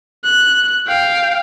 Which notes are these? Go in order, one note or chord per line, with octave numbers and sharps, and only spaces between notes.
F#6
F5 G5